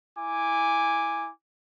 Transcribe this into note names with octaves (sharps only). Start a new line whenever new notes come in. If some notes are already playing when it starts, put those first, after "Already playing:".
E4 G#5 D6